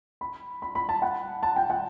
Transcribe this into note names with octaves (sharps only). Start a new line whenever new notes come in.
B5
B5
B5
A5
F#5
A5
G5
F#5